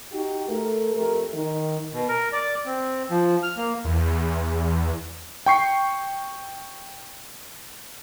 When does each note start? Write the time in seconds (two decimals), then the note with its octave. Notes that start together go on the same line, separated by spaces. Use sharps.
0.12 D#4 F#4 G4
0.48 A3 A#4
0.94 F2 A3 G4 A#4
1.33 D#3
1.93 B2
2.09 A#4
2.32 D5
2.66 C4
3.10 F3
3.43 F6
3.57 A#3
3.85 E2
5.46 G5 C#6 C7